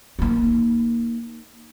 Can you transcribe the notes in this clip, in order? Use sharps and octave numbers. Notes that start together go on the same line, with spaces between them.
A#3 D#4